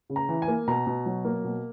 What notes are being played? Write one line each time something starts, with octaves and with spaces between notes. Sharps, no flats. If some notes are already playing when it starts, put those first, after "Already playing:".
C#3
A#5
E3
G#5
A#3
B2 A#5
B2
F#3
A#3
B2